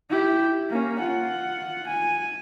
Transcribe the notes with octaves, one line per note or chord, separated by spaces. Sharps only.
E4 G4
A#3 C#4
F4 F#5
G#5